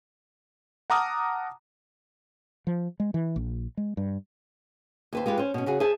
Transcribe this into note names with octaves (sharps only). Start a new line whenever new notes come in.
F#5 A5 A#5 D6 D#6 F6
F3
G#3
E3
A#1
G#3
G2
D#2 B4 C5
G#3 F4 G4 B4
C#4 C5
B2 C#4
C#3 F#4 G#4
G#4 C5 E5 A5